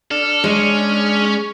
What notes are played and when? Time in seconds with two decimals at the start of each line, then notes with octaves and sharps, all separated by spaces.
0.11 D4 A4 F6
0.44 G#3 C#4